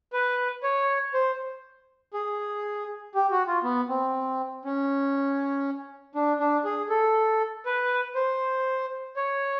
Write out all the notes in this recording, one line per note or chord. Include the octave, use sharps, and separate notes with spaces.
B4
C#5
C5
G#4
G4
F#4
F4
B3
C4
C#4
D4
D4
G#4
A4
B4
C5
C#5